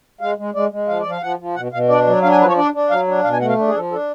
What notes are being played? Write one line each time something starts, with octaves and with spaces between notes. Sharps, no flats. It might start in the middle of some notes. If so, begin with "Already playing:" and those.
G#3 F5
G#3
G#3 D5
G#3
F3 F5
D5
F3
F5
F3 F#5
F3
B2 F#5
B2 F5
D4 D5
F#3
D4 F5
G#5
F3 B4
C#5
D4 D5
D4
F#3 F5
D4
B2 F5
G#5
A3 F#5
F5
D4
G#4
F3 A4
D4 A4